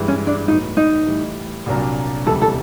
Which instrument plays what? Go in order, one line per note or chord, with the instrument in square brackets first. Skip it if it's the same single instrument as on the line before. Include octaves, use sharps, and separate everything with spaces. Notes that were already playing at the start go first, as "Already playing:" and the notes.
Already playing: [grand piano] G2 E3 G#3
[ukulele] C#4
D4
[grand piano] A2 F#3 B3 [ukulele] D#4
[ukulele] D#4
[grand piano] A2 E3 G3
C2 A#2 F#3 A#3 D4
[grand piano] E1 D2 C3 E3 G3 [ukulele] A4
[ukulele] A4